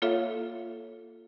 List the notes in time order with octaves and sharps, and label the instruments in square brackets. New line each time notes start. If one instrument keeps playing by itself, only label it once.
[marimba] A#3 F4 A4 C#5 E5 F5